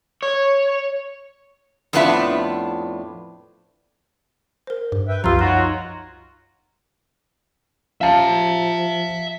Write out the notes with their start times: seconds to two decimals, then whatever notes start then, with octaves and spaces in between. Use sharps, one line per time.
0.23 C#5
1.93 F2 A2 B3 D4 F4 E5
4.67 A#4 C5
4.92 G2
5.08 B4 E5 G5
5.24 C2 F#2 F3 F4 G4 A#5 B5 E6
5.39 D#4 F4 F#4 C#5 A#5 C6
8.01 F3 E5 F5 A5 A#5